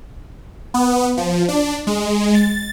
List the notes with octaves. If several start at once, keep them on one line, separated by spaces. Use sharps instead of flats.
B3
F3
D4
G#3
A6